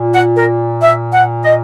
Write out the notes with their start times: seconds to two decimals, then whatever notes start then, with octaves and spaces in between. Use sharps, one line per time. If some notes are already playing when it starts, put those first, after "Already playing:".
Already playing: A#2
0.15 F#5
0.37 A#4
0.83 E5
1.14 F#5
1.45 D#5